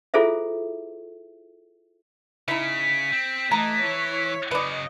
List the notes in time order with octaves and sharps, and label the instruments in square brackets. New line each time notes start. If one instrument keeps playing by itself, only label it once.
[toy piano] E4 F4 G#4 A4 C5 E5
[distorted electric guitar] C#3 [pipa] D#4 E4 [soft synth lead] B6
[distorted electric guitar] C4
[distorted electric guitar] E3 [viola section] A3 D#5 A5 [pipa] A#5
[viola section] E4 C#5
[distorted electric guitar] C#3 F#3 [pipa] B4 D5 [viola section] D#5